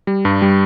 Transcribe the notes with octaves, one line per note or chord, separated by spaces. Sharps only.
G3
G2
G3